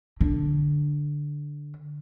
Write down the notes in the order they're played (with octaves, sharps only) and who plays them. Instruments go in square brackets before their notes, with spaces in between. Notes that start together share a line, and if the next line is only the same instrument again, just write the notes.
[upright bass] D3